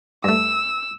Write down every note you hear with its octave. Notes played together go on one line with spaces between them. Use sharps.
G2 A3 E6